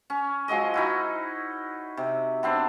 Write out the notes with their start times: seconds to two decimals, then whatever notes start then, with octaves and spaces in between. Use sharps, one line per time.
0.10 C#4
0.48 F3 F#3 G#3 D#5
0.74 D#4 E4 F#4
1.97 C3
2.43 B3 C4 D4